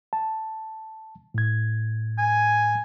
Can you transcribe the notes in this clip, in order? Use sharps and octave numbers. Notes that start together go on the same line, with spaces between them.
A5
A2 G#6
G#5